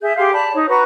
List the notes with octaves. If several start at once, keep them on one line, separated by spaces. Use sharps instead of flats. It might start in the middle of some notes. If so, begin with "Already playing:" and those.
G#4 E5 G6
G4 G#4 F5 C6
D5 A5 B5
D#4 C#5
F#4 B4 A#5 C#6